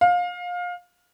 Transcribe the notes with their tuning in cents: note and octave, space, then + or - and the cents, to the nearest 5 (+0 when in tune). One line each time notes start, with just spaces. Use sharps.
F5 +25